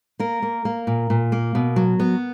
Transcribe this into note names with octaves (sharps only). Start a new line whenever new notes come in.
A#3 A#4
A#3
A#3
A#2
A#2
A#3
B2
F#3
B3